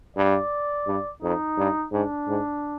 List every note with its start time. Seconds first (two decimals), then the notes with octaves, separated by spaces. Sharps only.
0.16 G2 D5
0.87 G2
1.23 F2 D#4
1.57 G2
1.92 G#2 D4
2.28 G#2